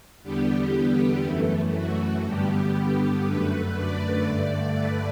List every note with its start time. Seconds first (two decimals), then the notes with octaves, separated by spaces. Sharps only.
0.23 E2 D3 G3 B3 G4
1.23 F#2 E3 A3
1.73 F#4
2.24 G2 D3 G3 B3 G4
3.24 F#2 D3 A3 B4
3.75 D5
4.25 G2 D3 A3
4.75 B4